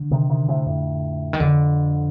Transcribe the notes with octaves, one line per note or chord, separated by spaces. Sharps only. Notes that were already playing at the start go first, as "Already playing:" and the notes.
Already playing: D3
C3 D#3
C3 D#3
A2 C3
F2 A2
D#3
F2 D3